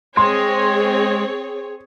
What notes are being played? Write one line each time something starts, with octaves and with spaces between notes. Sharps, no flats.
G#3 C4 G#4 C#5 C6